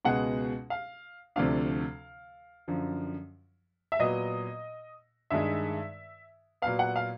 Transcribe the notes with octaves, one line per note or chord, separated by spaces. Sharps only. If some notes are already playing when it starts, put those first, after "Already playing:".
C#2 B2 G#3 B3 F#5
F5
D2 C3 F3 A3 D4 F5
F#2 D3 F3
E5
A#2 F#3 B3 D#5
G2 D#3 G#3 E5
A#2 F#3 B3 F5
F#5
F5